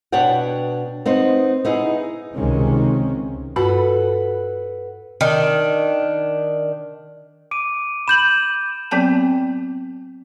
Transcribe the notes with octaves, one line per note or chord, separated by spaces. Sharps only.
B2 B3 D4 C#5 F#5 G5
B3 C4 D#4
B3 D#4 E4 G#4
C#2 C3 D#3 G#3 C4 C#4
G2 F#4 A4 B4 F#5 B5
D#3 D4
D6 D7 D#7
B5 G6 E7 F#7
F#3 B3 C4 G5 A5